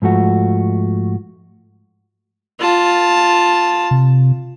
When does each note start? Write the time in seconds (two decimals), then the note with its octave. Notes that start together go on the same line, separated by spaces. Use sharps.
0.02 G#2 F3 A3 F#4
2.60 F4 A5
3.91 C3